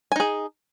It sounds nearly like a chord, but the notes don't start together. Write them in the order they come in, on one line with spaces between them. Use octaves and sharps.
G#5 D#4 G#4